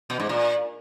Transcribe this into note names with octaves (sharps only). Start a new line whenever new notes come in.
B2
G#2
A#2